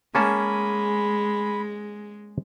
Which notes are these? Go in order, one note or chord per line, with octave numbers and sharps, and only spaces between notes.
G#3 A#3 C#4 G#4 A5 B5